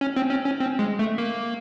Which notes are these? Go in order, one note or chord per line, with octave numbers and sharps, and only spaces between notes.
C#4
C4
C#4
C#4
C4
G#3
A3
A#3